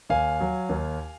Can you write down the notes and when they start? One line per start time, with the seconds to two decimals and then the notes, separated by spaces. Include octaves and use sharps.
0.09 D#2 F5 G#5
0.40 F#3
0.69 D#2